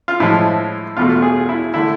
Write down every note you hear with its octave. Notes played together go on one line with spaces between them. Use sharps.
F4
A2 F3 G#3 E4
E2 B2 A3 F4
F4
G#4
E4
D3 A3 E4